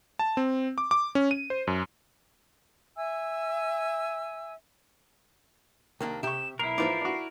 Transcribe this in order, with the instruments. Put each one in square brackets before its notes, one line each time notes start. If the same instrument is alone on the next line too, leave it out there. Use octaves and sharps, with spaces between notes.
[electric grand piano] A5
C4
D6
D6
C#4
D#7
C5
F#2
[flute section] E5 G#5 E6
[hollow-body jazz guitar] C2 A#3 D4 [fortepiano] D#3
[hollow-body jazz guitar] C3 G4 [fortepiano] E5 C#6 [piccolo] E7
[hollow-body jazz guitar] B1 [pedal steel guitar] E4 A#4 [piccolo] C7
[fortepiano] G#2 E3 F3 [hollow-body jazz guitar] F4 B4 D5
[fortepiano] D4 F#4